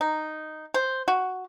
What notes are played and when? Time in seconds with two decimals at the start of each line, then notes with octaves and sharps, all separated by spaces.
0.01 D#4
0.74 C5
1.08 F#4